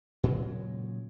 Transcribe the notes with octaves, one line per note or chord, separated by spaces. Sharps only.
A#2 C#3 F#3 G#3